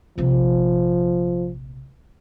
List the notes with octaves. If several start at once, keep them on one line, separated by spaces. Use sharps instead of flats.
A#1 C3 F3